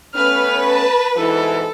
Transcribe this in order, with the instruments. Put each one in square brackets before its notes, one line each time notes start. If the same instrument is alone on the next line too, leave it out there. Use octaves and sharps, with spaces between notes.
[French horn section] A3 B3 C#4 [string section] B4 [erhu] F6
[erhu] A5
[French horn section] G#2 B2 E3 [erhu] A4